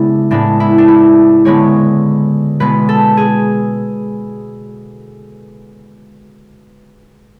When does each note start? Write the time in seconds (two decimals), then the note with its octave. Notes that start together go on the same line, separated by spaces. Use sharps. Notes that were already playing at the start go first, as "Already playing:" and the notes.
Already playing: C#3 G#3 B3 D4 E4
0.31 A2 G#3 B3 D4
0.60 E4
0.78 D4
0.88 E4
1.45 D3 G#3 B3 C#5
2.60 B2 G#3 B3 B4
2.89 A4
3.17 G#4